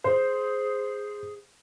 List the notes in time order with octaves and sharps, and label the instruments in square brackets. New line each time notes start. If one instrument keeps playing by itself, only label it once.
[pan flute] G#4 [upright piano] C5